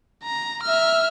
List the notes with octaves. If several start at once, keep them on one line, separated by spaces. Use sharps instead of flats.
A#5
E5 F6